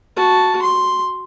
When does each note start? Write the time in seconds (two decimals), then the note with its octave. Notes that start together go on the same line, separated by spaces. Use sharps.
0.16 F#4 A5
0.62 C6